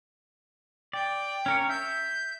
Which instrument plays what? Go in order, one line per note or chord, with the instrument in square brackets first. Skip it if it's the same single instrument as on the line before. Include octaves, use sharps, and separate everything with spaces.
[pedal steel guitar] D5 [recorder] G5
[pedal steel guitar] C#4 A#4 C#5
[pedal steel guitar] E5 E6 [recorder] G6